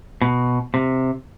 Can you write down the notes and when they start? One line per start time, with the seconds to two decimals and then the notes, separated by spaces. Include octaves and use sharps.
0.22 B2
0.74 C3